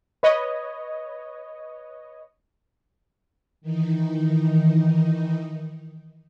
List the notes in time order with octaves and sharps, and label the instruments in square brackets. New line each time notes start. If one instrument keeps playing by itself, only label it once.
[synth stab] B4 C#5 D#5
[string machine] D#3 E3 D#4